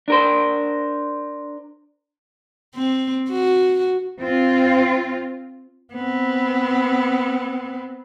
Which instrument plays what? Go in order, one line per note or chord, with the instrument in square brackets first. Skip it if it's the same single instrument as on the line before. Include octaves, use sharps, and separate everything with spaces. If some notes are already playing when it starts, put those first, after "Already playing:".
[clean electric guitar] D4 A#4 C5
[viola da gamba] C4
F#4
[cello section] C4 F4
[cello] B3 C4